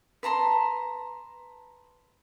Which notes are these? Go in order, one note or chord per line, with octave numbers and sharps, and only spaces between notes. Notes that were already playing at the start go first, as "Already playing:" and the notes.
B4 A5 A#5 C6